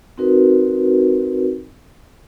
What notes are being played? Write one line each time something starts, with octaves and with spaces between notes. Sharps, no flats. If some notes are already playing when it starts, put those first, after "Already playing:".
C4 D#4 F#4 A#4 B4